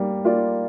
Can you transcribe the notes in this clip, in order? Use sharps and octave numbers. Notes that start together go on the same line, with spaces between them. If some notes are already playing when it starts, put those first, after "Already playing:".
Already playing: G3 A#3 D5
A#3 F4 D5